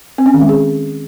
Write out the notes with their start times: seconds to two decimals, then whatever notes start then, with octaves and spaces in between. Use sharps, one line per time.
0.18 C4
0.26 C#4
0.34 D#3
0.41 G#3
0.49 G#4